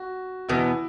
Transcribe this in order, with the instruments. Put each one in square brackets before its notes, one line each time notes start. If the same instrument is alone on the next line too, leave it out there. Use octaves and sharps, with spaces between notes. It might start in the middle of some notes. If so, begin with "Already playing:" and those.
Already playing: [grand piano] F#4
[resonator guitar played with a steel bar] E2 B2 B3 [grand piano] E4